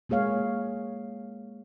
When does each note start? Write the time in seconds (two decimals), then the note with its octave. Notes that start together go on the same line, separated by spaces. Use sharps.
0.09 G#3 A#3 G#4 C#5 F5